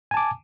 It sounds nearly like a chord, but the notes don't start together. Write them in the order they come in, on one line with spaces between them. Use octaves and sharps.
G#5 A5 D6